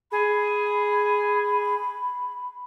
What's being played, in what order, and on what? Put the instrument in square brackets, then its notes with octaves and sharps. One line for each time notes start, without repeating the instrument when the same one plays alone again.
[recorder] G#4 [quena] B5